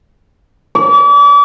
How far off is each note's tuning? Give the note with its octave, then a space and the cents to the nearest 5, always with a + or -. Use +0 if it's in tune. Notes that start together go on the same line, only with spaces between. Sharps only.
D5 -40